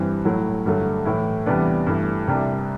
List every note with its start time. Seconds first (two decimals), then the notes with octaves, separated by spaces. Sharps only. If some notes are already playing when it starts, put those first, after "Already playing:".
Already playing: G2 E3 G3 C4
0.25 A2 F#3 A3 E4
0.66 G2 D3 F#3 A3
1.05 A2 E3 A3 E4
1.46 E2 C3 G3 B3 D4
1.87 G2 E3 A3
2.27 C2 C3 G3 D4